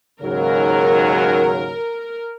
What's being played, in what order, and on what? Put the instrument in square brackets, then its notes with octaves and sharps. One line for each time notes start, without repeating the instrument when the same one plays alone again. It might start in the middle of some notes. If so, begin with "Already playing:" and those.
[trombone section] D#2 F#3 [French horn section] G#2 C#3 [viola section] A#4